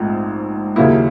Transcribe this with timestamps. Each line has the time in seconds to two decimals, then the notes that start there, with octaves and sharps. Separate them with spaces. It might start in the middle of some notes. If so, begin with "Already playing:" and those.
Already playing: A#1 G#2 F3 A3 C4
0.76 D#2 C#3 F#3 A#3 E4